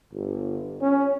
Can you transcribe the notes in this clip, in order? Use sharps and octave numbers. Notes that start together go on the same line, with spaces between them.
G1
C#4